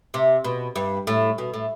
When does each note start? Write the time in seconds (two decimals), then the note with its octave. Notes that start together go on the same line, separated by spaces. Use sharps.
0.14 C3
0.44 B2
0.76 G2
1.07 A2
1.38 B2
1.54 A2